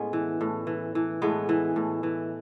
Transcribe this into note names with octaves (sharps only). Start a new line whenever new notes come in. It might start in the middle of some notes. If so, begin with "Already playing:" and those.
Already playing: A2 G#3 B3 C#4
E3
A2
E3
E3
A2 G#3 B3
E3
A2
E3